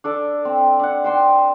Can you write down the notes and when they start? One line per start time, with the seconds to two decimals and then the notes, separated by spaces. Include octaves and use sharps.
0.04 D4 A4 D5
0.45 C4
0.80 D4 F#5
1.04 C5 G5 C6 D6